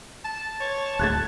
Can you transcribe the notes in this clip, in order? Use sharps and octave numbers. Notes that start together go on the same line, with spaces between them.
A5
C#5
D1 A3 F#6 G#6 A6